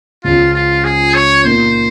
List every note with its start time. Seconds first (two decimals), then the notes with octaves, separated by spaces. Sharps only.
0.24 C#2 C#3 F3 F4
0.54 F4
0.84 G#4
1.15 C#5
1.44 A#2 F3 A#3 D#4 C5